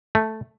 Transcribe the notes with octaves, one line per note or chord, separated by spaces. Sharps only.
A3